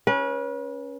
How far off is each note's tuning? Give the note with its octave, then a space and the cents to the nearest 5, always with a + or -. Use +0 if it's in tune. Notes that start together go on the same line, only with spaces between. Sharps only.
C#4 +0 B4 -35